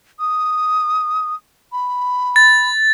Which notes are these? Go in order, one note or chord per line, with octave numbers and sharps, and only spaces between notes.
D#6
B5
A6